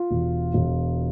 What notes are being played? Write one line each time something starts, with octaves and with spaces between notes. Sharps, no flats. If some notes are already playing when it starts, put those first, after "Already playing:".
Already playing: F4
E1
E1